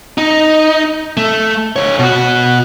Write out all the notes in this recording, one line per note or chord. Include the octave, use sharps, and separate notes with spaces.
D#4
A3
D3 C#5
B2 F#4